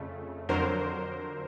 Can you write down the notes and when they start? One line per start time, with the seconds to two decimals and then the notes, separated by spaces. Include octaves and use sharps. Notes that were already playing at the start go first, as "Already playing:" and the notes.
Already playing: F2 C#3 A3
0.49 F2 D3 F#3 A#4 C5